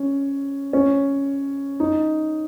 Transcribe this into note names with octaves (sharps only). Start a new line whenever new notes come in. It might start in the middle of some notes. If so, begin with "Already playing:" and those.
Already playing: C#4
C#4
D#4